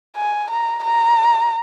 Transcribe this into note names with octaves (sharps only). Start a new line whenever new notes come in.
G#5
A#5
A#5